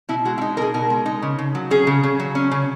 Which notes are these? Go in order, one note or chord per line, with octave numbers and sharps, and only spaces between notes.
B2 E4
G#3 F#4
E4
D#4
B2 G#4 A#4
B2 A#4
G#3
D#4
C#3
C#3
F#3
C#4 G#4
C#3
C#3
F#3
C#4
C#3